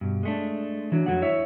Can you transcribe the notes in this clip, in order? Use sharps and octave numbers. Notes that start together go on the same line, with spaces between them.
G2 B2
G#3 A3 D4
E3 F#3 D4
F2 F#3 G#3 A3 F#5
E4 C#5 E5